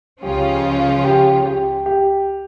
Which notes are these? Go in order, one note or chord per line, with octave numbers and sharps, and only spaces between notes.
C#2 C#3 F3 C#4 F4 G4
G4
G4
G4